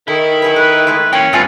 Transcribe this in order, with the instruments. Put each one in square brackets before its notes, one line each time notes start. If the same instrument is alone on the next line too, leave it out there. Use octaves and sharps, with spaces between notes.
[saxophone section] D#3 [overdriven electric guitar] E4 [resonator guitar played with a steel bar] A4
[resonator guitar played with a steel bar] F#3 G#4 B4
[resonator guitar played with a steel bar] A4 [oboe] B4
[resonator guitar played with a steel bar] G#3 A3 G#4
[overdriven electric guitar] E3 A#3 [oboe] C#4 [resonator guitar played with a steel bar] G5
[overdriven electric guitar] G2 [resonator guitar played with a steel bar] A3 C4 G#5 [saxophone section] B3 F4